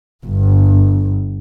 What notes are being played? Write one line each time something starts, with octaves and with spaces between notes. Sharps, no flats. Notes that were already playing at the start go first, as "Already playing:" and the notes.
G1